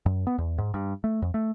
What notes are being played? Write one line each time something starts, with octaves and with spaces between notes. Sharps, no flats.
F#2
B3
E2
G#2
G2
A3
F2
A3